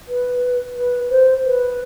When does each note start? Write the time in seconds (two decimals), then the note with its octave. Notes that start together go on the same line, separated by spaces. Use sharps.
0.08 B4
0.76 B4
1.10 C5
1.45 B4